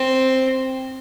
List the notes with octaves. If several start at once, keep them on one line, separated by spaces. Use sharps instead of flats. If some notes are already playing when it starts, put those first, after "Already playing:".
Already playing: C4